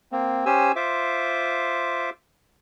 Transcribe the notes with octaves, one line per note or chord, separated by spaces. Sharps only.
A#3 C4
C#4 G4 C5 G#5 E6
F4 C5 E5 D6